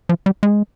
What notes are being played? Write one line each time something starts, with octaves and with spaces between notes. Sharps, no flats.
F3
G3
G#3